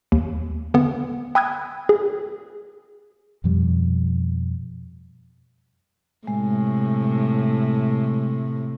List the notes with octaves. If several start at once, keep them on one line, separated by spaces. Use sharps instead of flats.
D#2
D3 B3
G5 B5 D#6 E6 F#6 G#6
G#4
F2 B2 F3 G3
A2 C3 G#3